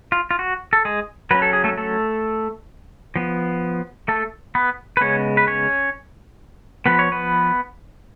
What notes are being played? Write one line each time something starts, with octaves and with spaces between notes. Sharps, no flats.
F4
F4
F#4
A4
G#3 G#4
F#3 C#4 B4
A4
G#4
A3 A4
A3 A4
F3 B3
A3 A4
B3 B4
B4
C#3 G#3 B3 C#4 C#5
B4
C#4 C#5
F3 B3 B4
C#5
B3 B4